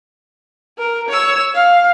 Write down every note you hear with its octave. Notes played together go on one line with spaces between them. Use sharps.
A#4
C#5 E6
F5